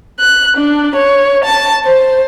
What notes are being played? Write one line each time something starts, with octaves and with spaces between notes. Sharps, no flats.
F#6
D4
C#5
A5
C5